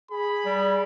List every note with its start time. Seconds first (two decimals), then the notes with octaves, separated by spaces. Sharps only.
0.11 G#4 B5
0.45 G3